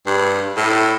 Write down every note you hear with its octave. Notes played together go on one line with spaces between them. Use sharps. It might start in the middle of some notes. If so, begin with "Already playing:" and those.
G2
A2